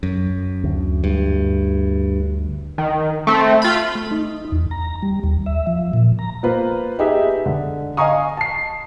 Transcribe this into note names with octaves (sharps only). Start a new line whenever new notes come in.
F#2
D2
G2
D#3
A3 C4
F4 B5
A3
D#4
E2
A#5
G3
D#2
E5
F3
A#2
A#5
A#3 F4 B4 C5
D#4 G4 G#4 B4 E5
D3
D#5 F5 G#5 A#5 C#6 D#6
A5 C7